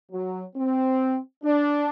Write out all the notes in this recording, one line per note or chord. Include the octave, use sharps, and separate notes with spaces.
F#3
C4
D4